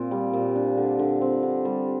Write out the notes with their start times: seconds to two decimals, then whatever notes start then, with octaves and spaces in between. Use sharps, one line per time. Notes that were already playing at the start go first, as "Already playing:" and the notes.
Already playing: A#2 C4
0.11 G3
0.33 A#2
0.56 D4
0.77 D3
0.99 D3
1.21 C4
1.43 D3
1.65 G3